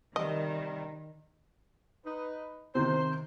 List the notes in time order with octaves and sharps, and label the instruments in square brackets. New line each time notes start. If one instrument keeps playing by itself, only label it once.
[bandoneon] C3 G3 [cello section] D#3 [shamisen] D#5
[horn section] D#4 B4
[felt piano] C3 D#3 [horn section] C5